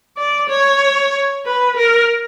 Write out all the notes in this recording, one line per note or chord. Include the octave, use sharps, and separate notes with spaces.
D5
C#5
B4
A#4